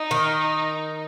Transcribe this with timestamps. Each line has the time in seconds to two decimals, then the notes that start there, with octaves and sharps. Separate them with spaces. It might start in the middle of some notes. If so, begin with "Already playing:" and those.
Already playing: D#4
0.11 D#3